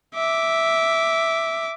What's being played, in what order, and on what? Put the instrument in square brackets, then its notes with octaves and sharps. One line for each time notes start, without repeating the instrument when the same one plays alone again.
[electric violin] E5 D6